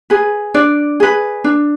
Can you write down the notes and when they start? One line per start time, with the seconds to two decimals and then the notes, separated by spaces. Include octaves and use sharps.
0.10 G#4 B4
0.54 D4 D5
1.00 G#4 B4
1.44 D4